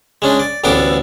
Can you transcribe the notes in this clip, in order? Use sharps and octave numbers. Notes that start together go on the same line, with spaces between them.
G#3 C#4 D4
D5
A1 D2 B3 D4 A4 D6